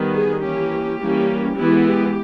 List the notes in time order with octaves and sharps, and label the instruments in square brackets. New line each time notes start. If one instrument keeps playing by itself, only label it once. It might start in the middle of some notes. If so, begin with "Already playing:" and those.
Already playing: [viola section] D#3 G3 B3
G#4
E3 A#3 C#4 G4
E3 G3 A#3 C#4
E3 G#3 B3 E4
G4